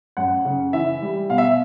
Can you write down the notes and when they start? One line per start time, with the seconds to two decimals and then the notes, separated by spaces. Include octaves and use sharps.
0.17 F#2 F#5
0.45 C#3
0.73 E3 E5
1.02 G3
1.30 B2 F5
1.38 E5